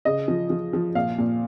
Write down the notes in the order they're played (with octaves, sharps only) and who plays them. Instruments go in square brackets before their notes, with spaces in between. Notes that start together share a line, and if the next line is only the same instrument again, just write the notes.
[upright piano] C#3 D#5
F3
F3
F3
A#2 F5
A#2